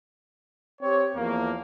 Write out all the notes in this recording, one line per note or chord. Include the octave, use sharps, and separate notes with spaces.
C4 G4 C#5
E2 F3 A#3